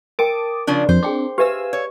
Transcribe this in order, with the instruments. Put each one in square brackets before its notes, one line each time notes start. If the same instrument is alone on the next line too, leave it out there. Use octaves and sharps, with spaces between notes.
[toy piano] A#4 G5 [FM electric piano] A5 D6 D#6
[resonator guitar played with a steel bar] C#3 F3 D4
[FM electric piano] F2 [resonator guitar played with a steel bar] C5
[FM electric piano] C4 D4 [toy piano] G#4 G5 D6
[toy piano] G4 B4 E5 [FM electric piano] F5 G#5 E6
[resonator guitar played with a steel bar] C#5